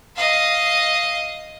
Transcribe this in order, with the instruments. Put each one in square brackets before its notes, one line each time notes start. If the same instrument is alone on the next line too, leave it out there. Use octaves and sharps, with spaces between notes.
[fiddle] D#5 F5